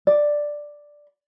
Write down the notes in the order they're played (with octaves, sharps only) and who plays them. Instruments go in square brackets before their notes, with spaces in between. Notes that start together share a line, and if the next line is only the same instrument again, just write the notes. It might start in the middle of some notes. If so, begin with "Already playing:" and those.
[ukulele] D5